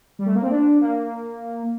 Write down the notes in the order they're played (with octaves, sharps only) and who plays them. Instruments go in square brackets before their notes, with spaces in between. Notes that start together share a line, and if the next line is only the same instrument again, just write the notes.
[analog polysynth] G3
A3
A#3
C4
D4
A#3